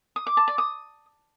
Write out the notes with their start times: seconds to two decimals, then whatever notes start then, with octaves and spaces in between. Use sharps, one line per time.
0.16 D#6
0.27 D6
0.37 A5
0.48 D5
0.58 D#6